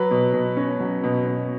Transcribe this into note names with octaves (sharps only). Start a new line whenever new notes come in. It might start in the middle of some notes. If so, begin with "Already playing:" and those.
Already playing: F#3 B4
B2
B2
C#4
F#3
B2
B2